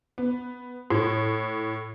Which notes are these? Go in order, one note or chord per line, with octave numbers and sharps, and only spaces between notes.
B3
A2